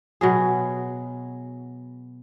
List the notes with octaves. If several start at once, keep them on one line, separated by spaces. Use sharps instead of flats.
B2 F#3 G#4